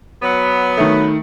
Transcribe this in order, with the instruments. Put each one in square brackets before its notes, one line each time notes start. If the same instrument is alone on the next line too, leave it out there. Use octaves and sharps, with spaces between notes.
[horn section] F#3 B3
[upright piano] D#3 A3